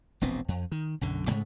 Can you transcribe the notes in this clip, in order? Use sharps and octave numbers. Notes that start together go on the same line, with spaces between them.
E1 A#1 B3 C4
F2
D#3
B1 F#2 D3
G#2 C#3 G#3 A3